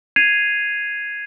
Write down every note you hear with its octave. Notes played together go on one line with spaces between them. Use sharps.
G#6 C7 D#7 F7